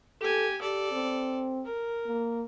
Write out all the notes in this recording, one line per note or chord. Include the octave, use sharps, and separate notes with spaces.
G4 A4 G#5
G4 A4 D5
C4
A#4
A#3